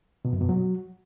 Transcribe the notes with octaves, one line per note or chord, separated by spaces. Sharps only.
B2
F#2
B2
F#3